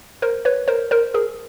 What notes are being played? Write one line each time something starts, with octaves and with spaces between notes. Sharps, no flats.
A#4 C5
B4 C#5
A#4 C5
A#4 C5
G#4 A#4